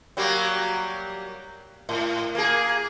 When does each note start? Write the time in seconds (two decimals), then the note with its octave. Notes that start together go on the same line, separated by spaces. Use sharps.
0.17 F#3 G3 A#3
1.89 A2
2.35 A#3 G#4